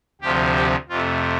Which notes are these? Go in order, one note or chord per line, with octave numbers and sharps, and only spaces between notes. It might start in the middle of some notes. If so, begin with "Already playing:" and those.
D2 C3 F3 G4
G4
F2 C3 A3 F4